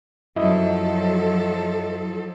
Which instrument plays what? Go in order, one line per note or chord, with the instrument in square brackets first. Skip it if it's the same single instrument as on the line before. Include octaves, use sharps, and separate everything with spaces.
[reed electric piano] F#2 E4 D#5 [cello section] F3 F#3 A4